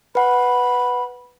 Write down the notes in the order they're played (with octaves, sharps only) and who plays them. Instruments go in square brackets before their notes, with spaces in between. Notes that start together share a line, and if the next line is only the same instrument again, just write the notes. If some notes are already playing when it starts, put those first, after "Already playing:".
[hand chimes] B4 F#5 [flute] B5